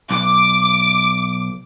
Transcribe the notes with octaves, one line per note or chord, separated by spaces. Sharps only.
B1 D6